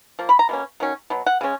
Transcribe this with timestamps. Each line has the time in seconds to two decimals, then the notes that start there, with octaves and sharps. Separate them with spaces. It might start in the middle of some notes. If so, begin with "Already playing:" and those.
0.19 F3 A#3
0.29 B5
0.39 A#5
0.49 B2 A#3 C#4
0.80 D#3 F#3 C#4
1.10 B2 F#3
1.26 F#5
1.41 C#3 G#3 C#4